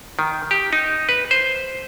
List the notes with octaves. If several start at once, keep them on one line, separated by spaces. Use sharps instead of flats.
D#3
G4
D#4
B4
C5